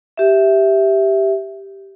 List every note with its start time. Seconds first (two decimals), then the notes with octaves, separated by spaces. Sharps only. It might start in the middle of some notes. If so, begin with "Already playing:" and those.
0.17 G4 E5